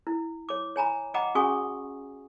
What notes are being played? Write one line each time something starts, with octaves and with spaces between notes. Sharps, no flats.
E4
C#5 D6
C#5 G#5 A#5 B5
D#5 F#5 G5 A#5 B5 D6
C#4 F#4 G#4 G#5 C#6 D#6